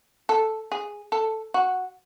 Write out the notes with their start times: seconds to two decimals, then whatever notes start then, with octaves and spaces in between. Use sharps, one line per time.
0.29 A4
0.72 G#4
1.12 A4
1.54 F#4